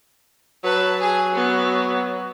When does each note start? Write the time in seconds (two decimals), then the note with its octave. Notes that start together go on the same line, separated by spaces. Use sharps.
0.64 F#3 B4 A5
1.00 G#4 G#5
1.33 B3